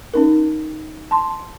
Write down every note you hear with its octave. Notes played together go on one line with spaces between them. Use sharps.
C#4 D#4 A#4
A5 C6